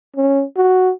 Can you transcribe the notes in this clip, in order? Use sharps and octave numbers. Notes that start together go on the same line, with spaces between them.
C#4
F#4